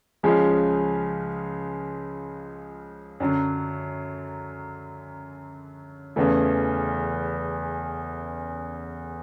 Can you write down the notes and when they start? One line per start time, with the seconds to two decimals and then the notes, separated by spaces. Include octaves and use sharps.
0.23 C#2 C#3 F3 G#3 C#4
3.20 F#2 D3 F#3
6.16 E2 C#3 E3 A3